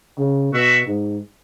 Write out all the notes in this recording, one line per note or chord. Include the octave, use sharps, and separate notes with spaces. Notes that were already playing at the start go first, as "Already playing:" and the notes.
C#3
B2 F#4 E5
G#2